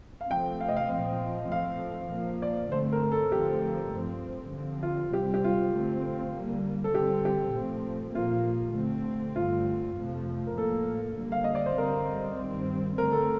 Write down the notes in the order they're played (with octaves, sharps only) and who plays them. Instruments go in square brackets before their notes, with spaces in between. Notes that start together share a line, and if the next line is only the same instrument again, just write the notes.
[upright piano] F5
[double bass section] C3 F3 A3 C4 [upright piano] G5
[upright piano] F5
D#5
F5
[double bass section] A#2 F3 C4 [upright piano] F5
[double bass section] A2 F3 A3 C4 [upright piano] F5
[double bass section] A#2 F3 A#3
[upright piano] D5
[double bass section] G2 D3 A3 C4 [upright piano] C5
[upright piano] A#4
A4
[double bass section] D3 F3 A3 C4 [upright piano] G4
[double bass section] G2 F3 C4
D3 F3 C4
[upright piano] F4
[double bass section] C3 G3 C4 [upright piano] G4
[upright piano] G4
F4
[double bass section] D3 A3 C4
D3 G3 A#3
[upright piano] A4
[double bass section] D3 G3 C4 [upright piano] G4
[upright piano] G4
[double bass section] A#2 F3 A3 C4
[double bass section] A#2 F3 A#3 [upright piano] F4
[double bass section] D3 A3 C4
[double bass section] G2 D3 A3 C4 [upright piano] F4
[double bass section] F2 C3 F3 A3
[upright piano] A#4
[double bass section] A2 F3 A#3 [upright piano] A4
[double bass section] D3 G3 A#3
[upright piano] F5
D#5
D5
C5
[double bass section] D3 G3 C4 [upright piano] A#4
[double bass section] G2 D#3 G3 C4
[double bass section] D3 A3 C4 [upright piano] A#4
[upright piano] A4